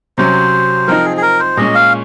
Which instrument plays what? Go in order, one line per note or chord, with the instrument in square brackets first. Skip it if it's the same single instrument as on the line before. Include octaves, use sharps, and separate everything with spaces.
[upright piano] C3 F#3 C#4 [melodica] C5
[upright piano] F3 C4 D#4 [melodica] A#4
[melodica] G#4
G#4
A#4
C5
[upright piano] A#2 G#3 C#4 [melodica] D#5
[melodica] F5